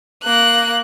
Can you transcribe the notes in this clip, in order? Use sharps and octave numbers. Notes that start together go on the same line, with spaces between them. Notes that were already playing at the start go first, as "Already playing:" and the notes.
A#3 F#6